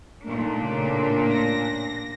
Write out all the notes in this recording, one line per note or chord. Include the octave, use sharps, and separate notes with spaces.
A#2 A3 A#3 D4 D#4
A2 C#3
A#6